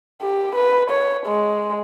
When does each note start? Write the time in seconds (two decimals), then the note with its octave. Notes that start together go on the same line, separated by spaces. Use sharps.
0.22 G4
0.55 B4
0.90 C#5
1.26 G#3